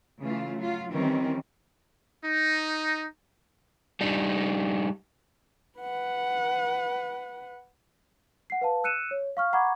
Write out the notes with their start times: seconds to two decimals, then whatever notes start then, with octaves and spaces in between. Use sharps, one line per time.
0.19 C#3 E3 A3 F4
0.58 F#3 F4
0.91 D#3 E3 G3 C4 C#4
2.24 D#4
4.01 G3 D4 D#4
5.79 B4 F#5
8.50 F#5 C7
8.61 B4 F5 A5
8.84 E6 F#6 C#7 D#7 E7
9.11 C#5
9.37 F5 C#6 F6
9.53 F#5 A#5 B5 C#6 D6 G#6